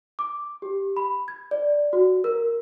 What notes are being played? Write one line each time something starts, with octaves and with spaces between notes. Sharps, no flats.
D6
G4
B5
G#6
D5
F#4
A#4